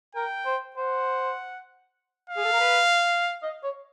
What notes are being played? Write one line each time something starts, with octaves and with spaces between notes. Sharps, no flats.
A#4 G5
C5
C5 F#5
F5
G#4
A4
A#4
B4
D#5
C#5